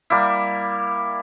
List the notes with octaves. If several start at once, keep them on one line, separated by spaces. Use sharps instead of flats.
G3 A#3 E4